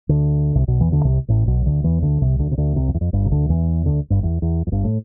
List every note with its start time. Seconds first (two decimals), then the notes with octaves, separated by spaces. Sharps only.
0.09 D2 D3
0.55 C2 C3
0.67 B1 B2
0.81 E2 E3
0.92 D2 D3
1.04 C2 C3
1.28 A1 A2
1.47 B1 B2
1.66 D2 D3
1.84 E2 E3
2.02 D2 D3
2.21 C2 C3
2.39 D2 D3
2.51 C3
2.58 D2 D3
2.76 C2 C3
2.89 F2
2.94 E2
3.01 F2
3.13 G1 G2
3.25 C3
3.31 D2 D3
3.49 E2 E3
3.86 D2 D3
4.10 G1 G2
4.23 E2
4.42 E2
4.67 F2
4.72 G1 G2
4.84 A2